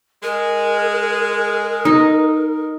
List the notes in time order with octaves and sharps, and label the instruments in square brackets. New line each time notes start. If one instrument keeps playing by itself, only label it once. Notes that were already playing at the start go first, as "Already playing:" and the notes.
[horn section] G#3 [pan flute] A#4
[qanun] D#4